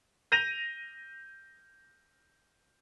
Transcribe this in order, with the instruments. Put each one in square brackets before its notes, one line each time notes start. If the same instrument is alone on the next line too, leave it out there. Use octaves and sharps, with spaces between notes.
[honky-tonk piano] G6 A#6 D#7 F7